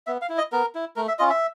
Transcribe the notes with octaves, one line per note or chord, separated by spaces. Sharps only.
B3 E5
F5
E4
D#5
B3 A#4
E4
A3 A#4
E5
C#4 F4 D#5
E5